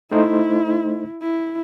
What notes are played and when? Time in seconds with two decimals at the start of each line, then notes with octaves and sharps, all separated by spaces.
0.11 A3 D#4 E4 C5
1.21 E4